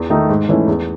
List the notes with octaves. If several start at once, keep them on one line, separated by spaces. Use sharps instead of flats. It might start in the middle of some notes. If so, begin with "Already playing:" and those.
Already playing: E2
D#3 A3 D#4
G#2
E3 A3 C#4 E4
E2